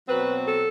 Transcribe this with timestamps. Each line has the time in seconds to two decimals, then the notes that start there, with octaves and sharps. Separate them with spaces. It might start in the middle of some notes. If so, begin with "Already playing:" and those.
0.07 B2 F#3 C4 B4
0.48 A4